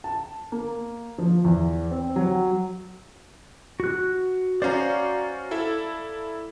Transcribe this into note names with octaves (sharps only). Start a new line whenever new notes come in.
A5
A#3
F3
E2
C4
F#3
F#4 F#6
C#4 F#4 C5 D5 F5 A#5
E4 A4 E5